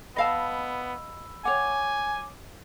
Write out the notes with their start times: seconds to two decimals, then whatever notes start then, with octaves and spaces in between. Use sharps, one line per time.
0.16 B3 D#5 F5 A5 B5 E6
1.45 C#5 F#5 G#5 D6